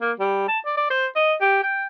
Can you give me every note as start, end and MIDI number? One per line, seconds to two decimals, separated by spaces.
0.01 0.12 58
0.20 0.46 55
0.48 0.59 81
0.66 0.76 74
0.77 0.87 74
0.91 1.07 72
1.16 1.34 75
1.41 1.62 67
1.64 1.87 79